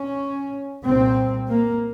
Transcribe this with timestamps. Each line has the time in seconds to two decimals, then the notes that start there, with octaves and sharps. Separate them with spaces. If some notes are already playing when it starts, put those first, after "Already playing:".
Already playing: C#4
0.84 C2 A#2 C4
1.50 A#3